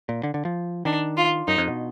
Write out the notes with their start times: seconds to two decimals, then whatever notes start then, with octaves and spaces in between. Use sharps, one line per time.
0.09 A#2
0.23 D3
0.34 D3
0.45 F3
0.85 D#3 D4
1.17 F4
1.48 F#2 D#4
1.58 F2
1.68 B2